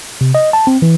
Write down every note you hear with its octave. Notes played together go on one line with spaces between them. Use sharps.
C3
D#5
A5
C4
E3